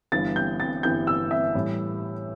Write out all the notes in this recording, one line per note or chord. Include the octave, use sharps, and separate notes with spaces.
G1 G2 E3 A6
G6
A6
G1 G2 E3 G6
E6
E5
A2 E3 G3